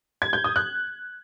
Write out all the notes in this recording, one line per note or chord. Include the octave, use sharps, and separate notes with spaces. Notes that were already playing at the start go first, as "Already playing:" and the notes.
G#6
G6
D#6
F#6